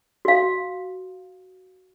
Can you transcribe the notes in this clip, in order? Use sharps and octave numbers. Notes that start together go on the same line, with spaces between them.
F#4 F5